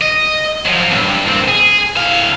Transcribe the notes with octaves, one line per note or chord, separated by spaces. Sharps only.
D#5
F3 F#3
B1 G2
A#2 C4
G#4
A2 F5